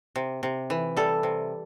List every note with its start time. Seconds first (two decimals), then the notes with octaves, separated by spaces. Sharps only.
0.16 C3
0.43 C3
0.70 E3
0.97 G3 A4
1.23 C3